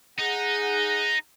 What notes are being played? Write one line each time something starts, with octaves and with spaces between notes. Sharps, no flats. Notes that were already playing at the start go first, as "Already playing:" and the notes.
D#4 G#4 F#5